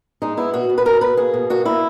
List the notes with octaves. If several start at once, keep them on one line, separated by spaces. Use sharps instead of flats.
G#3 D#4
B3 E4
B2 F#4
B2
B4
B2 A#4
B2 B4
A#3 G#4
B2
A#3 F#4
A#3 E4